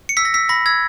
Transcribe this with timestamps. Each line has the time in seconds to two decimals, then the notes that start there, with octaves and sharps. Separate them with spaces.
0.09 C#7
0.17 E6 B6
0.25 A#6
0.34 E6 B6
0.49 B5 A#6
0.66 E6 G#6